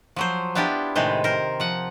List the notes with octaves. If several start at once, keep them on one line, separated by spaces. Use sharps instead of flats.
F3 F#3 C5
B3 D4 E4 F4 G4
A2 C3 D#3 G#3 B4 C5
A#4 C5
F3 F#5